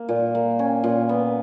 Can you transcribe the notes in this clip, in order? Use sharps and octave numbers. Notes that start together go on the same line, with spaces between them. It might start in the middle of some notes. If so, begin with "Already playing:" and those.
Already playing: A#3
A#2
A#3
C#4
A#2
B3